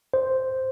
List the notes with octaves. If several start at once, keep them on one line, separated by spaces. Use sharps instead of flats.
C5